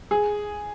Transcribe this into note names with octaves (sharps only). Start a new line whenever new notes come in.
G#4